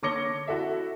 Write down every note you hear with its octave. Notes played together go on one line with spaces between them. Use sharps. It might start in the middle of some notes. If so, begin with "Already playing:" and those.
D3 C#5 D6 A#6 C#7 G7
E4 F#4 A4 E5